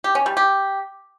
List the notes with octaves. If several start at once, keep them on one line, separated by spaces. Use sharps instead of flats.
G4
C#4
G3
G4